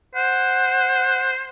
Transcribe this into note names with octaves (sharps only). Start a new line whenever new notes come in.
C5 F#5